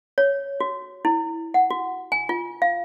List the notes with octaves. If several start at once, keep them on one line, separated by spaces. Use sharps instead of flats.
C#5
F#4
E4
F#5
F#4
G#5
F4
F5